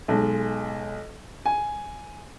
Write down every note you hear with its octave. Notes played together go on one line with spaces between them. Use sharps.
B1 G#3
G#5